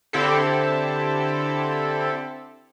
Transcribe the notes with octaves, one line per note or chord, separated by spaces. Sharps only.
D3 C4 E4 G4 A4